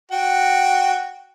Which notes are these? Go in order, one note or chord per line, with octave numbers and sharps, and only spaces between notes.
F#4 G5